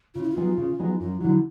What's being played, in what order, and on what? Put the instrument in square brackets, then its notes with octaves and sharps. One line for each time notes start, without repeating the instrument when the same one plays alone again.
[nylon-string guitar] C#3 [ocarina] F4
[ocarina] E4
F4
[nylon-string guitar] F#3 B3 D#4 G#4
C#3
F#3 B3 D#4 G#4
[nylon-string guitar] F#2 [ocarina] F4
[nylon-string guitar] D3 F#3 [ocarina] E4